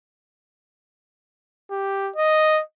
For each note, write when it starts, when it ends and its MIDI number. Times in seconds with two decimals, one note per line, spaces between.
1.71 2.11 67
2.16 2.61 75